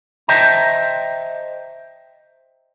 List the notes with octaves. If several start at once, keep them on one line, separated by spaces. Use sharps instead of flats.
C5 D#5 E5 G5 A5 A#5